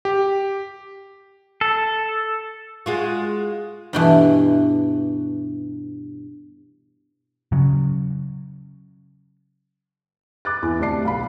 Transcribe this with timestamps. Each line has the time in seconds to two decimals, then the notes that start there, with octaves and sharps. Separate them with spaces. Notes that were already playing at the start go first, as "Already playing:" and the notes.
0.05 G4
1.61 A4
2.86 G#3 F4 F#4
3.93 G2 B2 E3
7.52 C#3 F#3
10.45 D6 F#6 A6
10.62 E2
10.79 D2 C3 G4 D5 A5 C7
11.05 B1 F5 B5